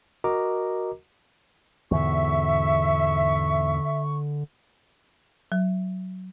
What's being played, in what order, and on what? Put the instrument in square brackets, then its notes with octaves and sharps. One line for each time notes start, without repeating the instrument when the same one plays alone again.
[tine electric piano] F#4 A#4 D#5 A#5 D6
[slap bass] E2 G#2 B2 [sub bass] D3 [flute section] E5 [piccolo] C#6
[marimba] F#3